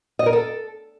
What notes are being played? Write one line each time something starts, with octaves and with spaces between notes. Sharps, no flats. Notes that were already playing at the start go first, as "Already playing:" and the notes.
D#5
A#4
A4